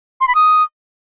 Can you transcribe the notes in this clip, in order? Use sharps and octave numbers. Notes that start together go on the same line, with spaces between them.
C6
B5
D#6